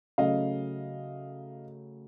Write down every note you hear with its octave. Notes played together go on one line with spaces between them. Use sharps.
C#3 F#3 A3 C#4 D#5 F5